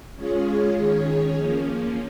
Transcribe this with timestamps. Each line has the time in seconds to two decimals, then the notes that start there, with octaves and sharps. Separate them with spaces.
0.16 G#3 C#4 F4 G#4 C#5
0.76 D#3 C#4 G#4 C#5
1.36 F3 A#3 C#4